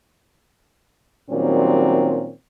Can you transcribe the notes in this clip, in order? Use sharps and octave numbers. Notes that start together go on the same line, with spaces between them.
A#2 D#3 F#3 G3 C4 C#4